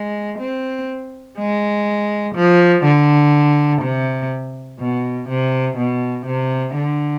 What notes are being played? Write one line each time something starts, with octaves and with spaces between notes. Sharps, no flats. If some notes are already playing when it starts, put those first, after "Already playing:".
Already playing: G#3
C4
G#3
F3
D3
C3
B2
C3
B2
C3
D3